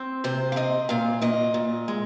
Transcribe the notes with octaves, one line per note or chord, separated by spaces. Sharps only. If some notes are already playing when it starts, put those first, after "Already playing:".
Already playing: C4
C3 C5
F5
C4 D#5
A#2 F5
A#2 D#5
A#2
G#3